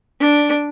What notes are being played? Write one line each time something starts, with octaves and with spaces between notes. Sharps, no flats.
D4